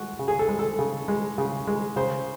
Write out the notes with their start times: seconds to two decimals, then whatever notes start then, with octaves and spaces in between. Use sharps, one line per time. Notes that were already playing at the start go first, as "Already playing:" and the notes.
Already playing: G#3 F#4
0.19 C#3
0.28 G#4
0.39 A4
0.49 G#3
0.59 A4
0.79 C#3
1.08 G#3
1.38 C#3
1.67 G#3
1.96 C#3 C5